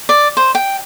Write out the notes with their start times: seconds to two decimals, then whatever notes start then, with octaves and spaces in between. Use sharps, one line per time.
0.09 D5
0.37 C5
0.55 G5